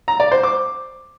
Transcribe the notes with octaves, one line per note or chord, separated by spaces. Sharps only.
A#5
D5
C5
D6